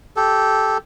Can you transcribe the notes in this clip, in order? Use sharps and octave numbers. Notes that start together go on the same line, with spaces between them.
G4 A4